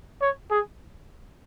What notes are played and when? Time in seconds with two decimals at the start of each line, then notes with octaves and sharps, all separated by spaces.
0.22 C#5
0.51 G#4